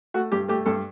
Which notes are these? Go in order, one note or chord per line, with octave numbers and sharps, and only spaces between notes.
A3 F#4
G2 G4
A3 G4
G2 A4